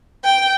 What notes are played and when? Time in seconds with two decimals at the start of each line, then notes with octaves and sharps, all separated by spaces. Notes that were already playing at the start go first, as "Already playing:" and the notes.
0.24 G5